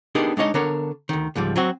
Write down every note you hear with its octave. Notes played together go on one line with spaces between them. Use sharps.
B3 D4 D#4 G4 G#4 A#4
G#3 D4 D#4 C#5 D#5
D3 B3 D4 A#4 C#5
D2 D#3
C#2 G#2 F3 G3
F#3 C4 F#4